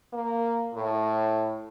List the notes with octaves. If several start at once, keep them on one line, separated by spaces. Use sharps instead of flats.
A#3
A2